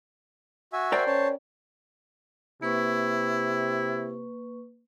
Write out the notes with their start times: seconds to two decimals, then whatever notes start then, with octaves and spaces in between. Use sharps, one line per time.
0.73 F#4 E5 G#5
0.92 A#4 C5 D5 G5
1.07 C#4 C#5 A5
2.62 C3 A#3 E4 B4 C#6